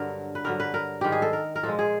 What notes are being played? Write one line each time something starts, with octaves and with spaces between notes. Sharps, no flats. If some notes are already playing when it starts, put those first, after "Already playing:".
Already playing: G2 D3 F#3 A#4
B4
G2 D3 F#3 A#4
B4
A#4
G#2 D#3 G3 G4
G#4
A4
A#4
A#4
A#2 F3 G#3 A4
G#4